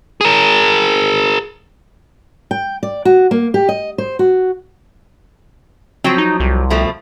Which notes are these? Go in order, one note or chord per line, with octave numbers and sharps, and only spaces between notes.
G#4 A#4
G5
D5
F#4
A#3
G4
D#5
C5
F#4
F3 F#3 C4
D#4
C2
B2 F3 A3